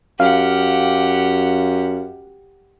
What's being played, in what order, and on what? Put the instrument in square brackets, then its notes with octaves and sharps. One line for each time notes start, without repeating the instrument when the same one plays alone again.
[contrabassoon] F#2 [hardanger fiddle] G4 F#5 [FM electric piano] F5